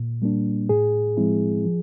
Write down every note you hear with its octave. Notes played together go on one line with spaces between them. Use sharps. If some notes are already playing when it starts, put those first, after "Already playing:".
Already playing: A#2
G3 A#3 D4
A2 G#4
F3 G#3 C4 E4
F3